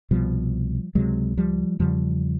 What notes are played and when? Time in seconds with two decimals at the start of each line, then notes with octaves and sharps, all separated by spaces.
0.11 C2 B2 F3 G3
0.95 C#2 C3 F#3 G#3
1.37 F3 G3
1.79 E2 C#3 F3 G3